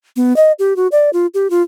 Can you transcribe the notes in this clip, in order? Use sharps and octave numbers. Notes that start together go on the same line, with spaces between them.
B3
D#5
G4
F#4
D5
F4
G4
F4